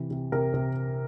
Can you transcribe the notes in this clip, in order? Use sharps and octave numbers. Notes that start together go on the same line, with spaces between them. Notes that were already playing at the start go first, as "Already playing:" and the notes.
Already playing: C3 E3
C3
C3 A#4
C3